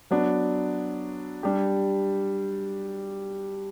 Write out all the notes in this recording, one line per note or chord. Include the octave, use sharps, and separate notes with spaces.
F#3 B3 D4
G3 D4 G4